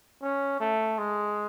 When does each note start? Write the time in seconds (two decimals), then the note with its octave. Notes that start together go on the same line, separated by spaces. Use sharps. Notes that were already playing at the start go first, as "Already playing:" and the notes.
0.22 C#4
0.60 A3
0.98 G#3